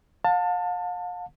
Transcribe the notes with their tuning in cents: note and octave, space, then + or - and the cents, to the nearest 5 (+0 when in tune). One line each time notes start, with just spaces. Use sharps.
F5 +40 A5 +20